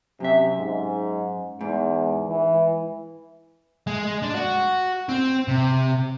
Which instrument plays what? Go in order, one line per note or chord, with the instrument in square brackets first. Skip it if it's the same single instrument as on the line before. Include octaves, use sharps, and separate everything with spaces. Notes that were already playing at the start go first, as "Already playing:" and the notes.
[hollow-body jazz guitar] F#2 E5 [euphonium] C3
[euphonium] G#2
[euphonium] E2 [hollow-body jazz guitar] G#2
[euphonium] E3
[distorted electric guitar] G#3
D4
F#4
C4
C3